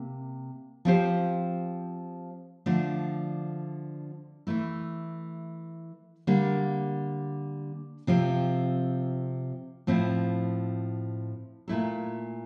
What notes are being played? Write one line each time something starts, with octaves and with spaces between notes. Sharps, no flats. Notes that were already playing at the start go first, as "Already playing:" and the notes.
Already playing: C3 A#3
F3 C4 G4 C5
D3 F3 A3 D4
E3 A3 E4
D3 G3 A#3
C3 F3 C4
A2 F3 C4 E4
A#2 A3 E4 A4